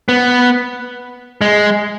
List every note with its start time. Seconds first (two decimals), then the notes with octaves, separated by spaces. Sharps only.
0.09 B3
1.41 G#3